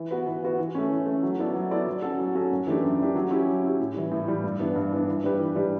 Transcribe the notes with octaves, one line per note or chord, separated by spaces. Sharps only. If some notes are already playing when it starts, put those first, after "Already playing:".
Already playing: E3
B3 F#4 B4
E3
B3 F#4 B4
E3
A3 C#4
E3
A3 C#4
F#3
B3 E4 A4 D5
F#3
B3 E4 A4 D5
F#3
C#4 F#4 A4
F#3
C#4 F#4 A4
F#2
E3 A3 D4 G4
F#2
E3 A3 D4 G4
F#3
C#4 E4 G4
F#3
C#4 E4 G4
A2
E3 G3
A2
E3 G3
G2
E3 B3 D4
G2
E3 B3 D4
E3
G3 D4 G4 B4
E3
G3 D4 G4 B4